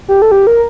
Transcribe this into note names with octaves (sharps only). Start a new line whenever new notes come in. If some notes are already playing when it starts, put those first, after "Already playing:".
G4
A4
G4
A#4